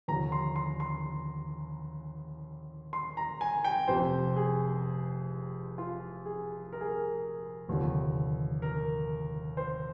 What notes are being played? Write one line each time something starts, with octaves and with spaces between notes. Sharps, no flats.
D#2 D3 F3 A#5
C6
C6
C6
C6
A#5
G#5
G5
F1 F2 C3 C5
G#4
F4
G#4
A#4
G#4
A#4
F1 D#2 D3 F3
A#4
C5